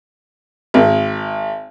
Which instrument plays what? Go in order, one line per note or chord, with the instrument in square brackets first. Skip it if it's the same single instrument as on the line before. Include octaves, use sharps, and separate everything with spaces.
[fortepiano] G#1